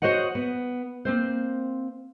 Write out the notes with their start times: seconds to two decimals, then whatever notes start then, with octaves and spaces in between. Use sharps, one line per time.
0.02 F#4 C5 C#5 D#5 F#5
0.35 B3
1.05 A#3 C4 C5